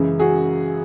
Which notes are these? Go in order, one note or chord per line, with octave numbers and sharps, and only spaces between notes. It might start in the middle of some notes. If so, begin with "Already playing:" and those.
Already playing: F#2 C#3 E3 G#3
F#4 G#4